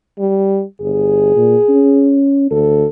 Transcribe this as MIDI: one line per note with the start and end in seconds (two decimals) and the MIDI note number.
0.19 0.63 55
0.81 1.33 31
0.81 2.19 68
1.36 1.56 46
1.69 2.51 61
2.51 2.86 38
2.51 2.88 69